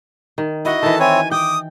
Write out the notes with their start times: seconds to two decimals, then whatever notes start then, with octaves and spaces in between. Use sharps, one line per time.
0.38 D#3
0.65 E4 F#4 D#5 F#5
0.82 D#3 E3 A4 A5
1.00 C4 E4 C#5 G#5
1.31 G5 D6 D#6